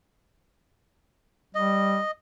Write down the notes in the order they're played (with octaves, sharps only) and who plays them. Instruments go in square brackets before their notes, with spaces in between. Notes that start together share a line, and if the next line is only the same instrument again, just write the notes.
[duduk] G3 [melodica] D#5